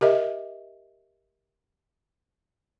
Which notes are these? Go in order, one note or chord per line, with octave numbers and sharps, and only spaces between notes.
G4 A#4 D#5 E5